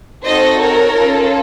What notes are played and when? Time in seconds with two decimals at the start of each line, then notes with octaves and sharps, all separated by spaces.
0.25 C4 D#4 F#4 A4 C5 D#5
0.60 A#4 C#5
0.96 C#4 F4 A4